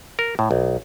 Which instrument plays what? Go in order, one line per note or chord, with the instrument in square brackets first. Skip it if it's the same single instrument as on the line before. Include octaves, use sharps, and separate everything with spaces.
[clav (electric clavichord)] A#4
A2
B1